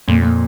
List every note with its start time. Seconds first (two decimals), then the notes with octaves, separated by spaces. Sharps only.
0.08 F2 A#2
0.22 A#2